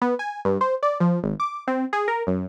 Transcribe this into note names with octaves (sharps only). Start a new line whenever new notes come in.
B3
G#5
G2
C5
D5
F3
G#1
D6
C4
G#4
A#4
F#2